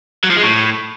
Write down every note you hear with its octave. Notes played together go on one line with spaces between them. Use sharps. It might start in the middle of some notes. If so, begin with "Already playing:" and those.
F#3
F3
G#3
A2